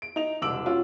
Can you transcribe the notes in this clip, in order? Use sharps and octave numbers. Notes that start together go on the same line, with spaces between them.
D7
D#4 F7
E1 C2 D6 E6 D7 F#7
C#4 F4 F#4